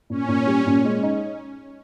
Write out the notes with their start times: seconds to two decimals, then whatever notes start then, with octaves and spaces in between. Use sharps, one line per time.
0.10 A#2 C#4
0.28 A#2
0.47 G3
0.67 A#2
0.85 G#3
1.03 D#4